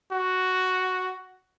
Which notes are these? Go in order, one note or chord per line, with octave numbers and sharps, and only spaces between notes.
F#4